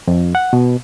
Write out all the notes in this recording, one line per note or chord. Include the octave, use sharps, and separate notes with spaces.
F2
F#5
B2